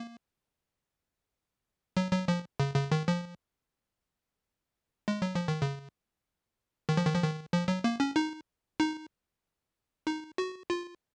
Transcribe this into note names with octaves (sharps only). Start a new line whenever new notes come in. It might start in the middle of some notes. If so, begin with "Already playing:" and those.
Already playing: A#3
F#3
F#3
F3
C#3
C#3
D#3
F3
G#3
F#3
F3
D#3
C#3
D#3
F3
D#3
F3
D#3
F3
F#3
A#3
C#4
D#4
D#4
D#4
F#4
F4